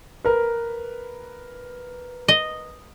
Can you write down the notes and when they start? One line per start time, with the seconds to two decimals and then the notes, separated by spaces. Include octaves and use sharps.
0.25 A#4 B4
2.28 D#5